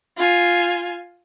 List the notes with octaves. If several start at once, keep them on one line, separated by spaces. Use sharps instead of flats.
F4 G#5